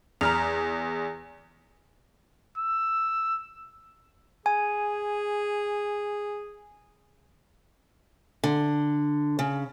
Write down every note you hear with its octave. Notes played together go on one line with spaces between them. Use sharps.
E2 A#5 F6 F7
E6
G#4 G#5
D3
C#3